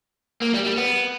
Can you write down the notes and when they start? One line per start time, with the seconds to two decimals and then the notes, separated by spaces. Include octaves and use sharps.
0.42 A#3
0.54 G3
0.66 G3
0.77 B3